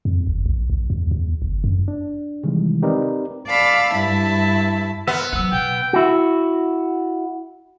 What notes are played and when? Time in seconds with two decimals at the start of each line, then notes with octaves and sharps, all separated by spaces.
0.05 F2
0.27 G1
0.46 A#1
0.70 A#1
0.90 E2
1.11 E2
1.42 G1
1.64 F#2
1.88 D4
2.43 C3 D#3 E3 G3 G#3
2.82 C4 D#4 G4 A#4 B4 D5
3.48 D5 F5 A5 B5 E6
3.95 G2 E4 A5 B5
5.07 B3 A#4 C5 E5
5.33 F3 F#3 F#5 E6
5.52 B2 G5
5.93 E4 F#4